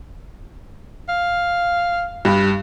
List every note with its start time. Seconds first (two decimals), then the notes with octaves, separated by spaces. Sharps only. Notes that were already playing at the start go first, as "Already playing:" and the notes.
1.09 F5
2.25 G2